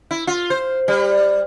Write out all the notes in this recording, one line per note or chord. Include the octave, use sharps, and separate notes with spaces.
E4
F4
C5
G3